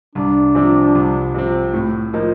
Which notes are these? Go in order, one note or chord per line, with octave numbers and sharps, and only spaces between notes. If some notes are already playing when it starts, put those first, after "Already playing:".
C2 D4
C3 F3 C4
C2
C3 F3 C4
A2
F3 A#3 D#4